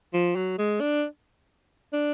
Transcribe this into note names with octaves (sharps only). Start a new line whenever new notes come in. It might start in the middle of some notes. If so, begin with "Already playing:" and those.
F3
F#3
G#3
D4
D4